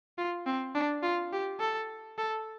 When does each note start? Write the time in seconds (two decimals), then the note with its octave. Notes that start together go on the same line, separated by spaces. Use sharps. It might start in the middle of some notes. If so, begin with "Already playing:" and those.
0.18 F4
0.47 C4
0.75 D4
1.03 F4
1.33 G4
1.60 A4
2.18 A4